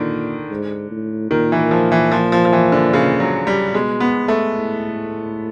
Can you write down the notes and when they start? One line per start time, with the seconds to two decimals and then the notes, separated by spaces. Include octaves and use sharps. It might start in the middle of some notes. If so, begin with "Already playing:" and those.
Already playing: A#2 D3 D#3
0.50 G#2
0.91 A2
1.31 A#2 D#3
1.52 E3
1.71 F3
1.92 E3
2.12 F3
2.32 F3
2.45 F3
2.53 E3
2.72 D3
2.93 C#3
3.20 F#3
3.47 G3
3.73 B2 G#3
4.00 B3
4.28 A3
4.55 A2